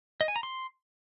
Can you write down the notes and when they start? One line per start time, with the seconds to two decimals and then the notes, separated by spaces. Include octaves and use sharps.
0.21 D#5
0.28 G#5
0.36 A#5
0.43 C6